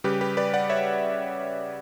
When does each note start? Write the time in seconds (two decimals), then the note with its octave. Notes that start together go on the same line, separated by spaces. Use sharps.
0.04 C#3 G3 G4 B4
0.21 G4 B4
0.37 B4 D5
0.54 D5 F#5
0.70 C#5 E5